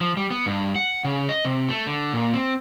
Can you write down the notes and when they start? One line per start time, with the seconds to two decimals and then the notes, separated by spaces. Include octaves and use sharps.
0.01 F3
0.17 G3
0.31 B3
0.46 G2
0.76 F#5
1.05 C#3
1.29 D#5
1.45 C3
1.69 A3
1.87 D3
2.14 A#2
2.33 C4